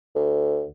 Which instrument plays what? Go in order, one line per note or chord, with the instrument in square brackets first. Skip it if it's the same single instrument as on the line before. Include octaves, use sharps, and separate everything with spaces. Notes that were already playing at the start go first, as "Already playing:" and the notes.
[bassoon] D2